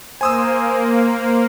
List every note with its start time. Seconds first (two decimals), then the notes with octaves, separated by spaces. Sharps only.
0.21 A#3 C5 G#5 D#6 E6